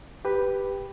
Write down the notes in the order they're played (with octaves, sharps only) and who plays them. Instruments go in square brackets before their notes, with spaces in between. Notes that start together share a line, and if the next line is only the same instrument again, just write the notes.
[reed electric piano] G4 B4